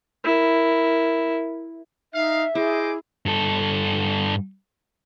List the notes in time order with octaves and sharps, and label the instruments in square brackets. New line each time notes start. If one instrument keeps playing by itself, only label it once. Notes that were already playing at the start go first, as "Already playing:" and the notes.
[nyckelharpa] E4 A#4
[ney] D#4 [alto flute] E5 [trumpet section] F5
[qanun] E4 [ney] G#4 [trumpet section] C5 D#5 D6
[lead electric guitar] G2 A4